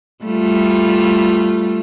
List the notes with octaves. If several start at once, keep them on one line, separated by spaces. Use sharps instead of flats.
G3 A3 F4